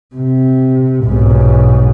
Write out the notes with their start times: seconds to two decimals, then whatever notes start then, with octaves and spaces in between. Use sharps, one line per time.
0.16 C3
1.05 B1 G#2